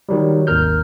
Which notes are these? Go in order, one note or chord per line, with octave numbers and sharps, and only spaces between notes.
D#3 F#3 G3
G#1 D#2 A#4 F6 G6